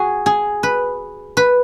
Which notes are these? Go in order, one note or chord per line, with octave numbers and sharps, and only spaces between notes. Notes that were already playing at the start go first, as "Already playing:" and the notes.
Already playing: F#4 G#4
G#4
B4
B4